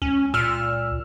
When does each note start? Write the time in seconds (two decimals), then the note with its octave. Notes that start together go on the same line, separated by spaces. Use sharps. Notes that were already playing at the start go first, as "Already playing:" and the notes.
0.02 C#2 C#4
0.34 A#2 E6 F6